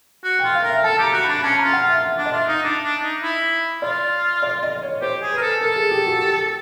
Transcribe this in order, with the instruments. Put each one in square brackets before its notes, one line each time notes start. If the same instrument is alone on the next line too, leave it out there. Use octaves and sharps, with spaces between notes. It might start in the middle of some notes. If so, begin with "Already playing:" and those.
[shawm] F#4
[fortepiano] G5
[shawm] F4
[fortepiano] F5
[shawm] A#4
[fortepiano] E5
[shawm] A4 [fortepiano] A5
[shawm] G4 [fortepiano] A#5
[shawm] F#4
[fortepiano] B5
[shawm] D4
[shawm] C#4 [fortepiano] A5
[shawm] F4 [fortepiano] A#5
[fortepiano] F#5
[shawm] F4
[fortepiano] E5
E5
[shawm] D4
[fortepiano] D#5
[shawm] F4 [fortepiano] E5
[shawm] D#4
D4
D4
D#4
E4
[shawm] F4 [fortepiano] D5
[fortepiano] D5
D#5
C#5
[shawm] G4 [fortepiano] C5
[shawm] G#4
[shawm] A#4 [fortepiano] B4
[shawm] A4
[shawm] A4 [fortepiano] A#4
[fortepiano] G#4
G4
F#4
G4